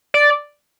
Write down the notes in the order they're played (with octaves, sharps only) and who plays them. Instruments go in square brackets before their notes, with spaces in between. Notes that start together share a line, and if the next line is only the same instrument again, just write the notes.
[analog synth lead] D5